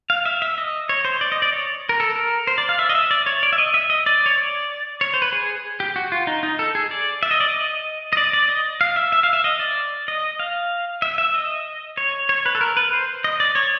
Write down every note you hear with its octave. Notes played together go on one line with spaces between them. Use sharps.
F5
E5
E5
D#5
C#5
C5
D5
D#5
D5
C#5
A#4
A4
A#4
C5
D5
F5
E5
D#5
E5
D5
C#5
D5
E5
D#5
E5
D#5
D5
C#5
D5
C#5
C5
B4
G#4
G4
F#4
F4
D#4
D#4
A4
G#4
D5
E5
D#5
D5
D#5
D#5
D5
D5
D#5
F5
E5
E5
F5
E5
D#5
D5
D#5
F5
E5
E5
D#5
C#5
C#5
B4
A4
A#4
B4
C5
D#5
D5
C#5